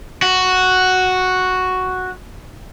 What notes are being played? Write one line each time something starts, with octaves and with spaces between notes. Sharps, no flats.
F#4